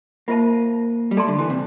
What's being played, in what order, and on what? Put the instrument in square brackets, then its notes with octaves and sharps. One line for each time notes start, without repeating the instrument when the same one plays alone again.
[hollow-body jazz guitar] A#3 [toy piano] F4 C5 E5 A5
[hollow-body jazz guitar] G3
[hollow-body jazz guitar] A3 [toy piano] A4 D5 A5 C6
[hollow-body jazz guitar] D3
E3
C3